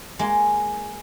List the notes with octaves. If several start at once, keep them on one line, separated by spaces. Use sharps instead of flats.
G#3 A#3